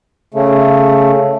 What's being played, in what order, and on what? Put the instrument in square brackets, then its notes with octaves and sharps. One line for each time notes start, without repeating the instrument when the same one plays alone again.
[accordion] C#3 A3